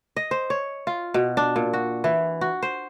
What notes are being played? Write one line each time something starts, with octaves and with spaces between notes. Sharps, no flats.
D#5
C5
C#5
F4
B2
D4
A#2
F#4
E3
F#4
C5